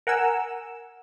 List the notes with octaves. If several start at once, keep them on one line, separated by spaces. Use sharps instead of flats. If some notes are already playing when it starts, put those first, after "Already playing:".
A#4 F#5 G#5 E6